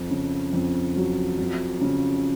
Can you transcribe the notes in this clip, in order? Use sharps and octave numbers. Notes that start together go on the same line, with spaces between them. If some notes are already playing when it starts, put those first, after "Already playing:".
Already playing: F2
C#3
F2
F#3
F2
C#3